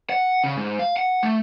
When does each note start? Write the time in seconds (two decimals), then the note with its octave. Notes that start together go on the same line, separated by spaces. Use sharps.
0.10 F#5
0.44 C#3
0.57 G#2
0.79 F5
0.97 F#5
1.23 A3